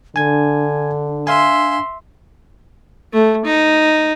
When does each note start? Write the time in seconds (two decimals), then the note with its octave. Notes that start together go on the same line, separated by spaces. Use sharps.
0.16 D3 D4 G#5 G#6
1.27 E5 F5 G#5 C6
3.13 A3
3.45 D#4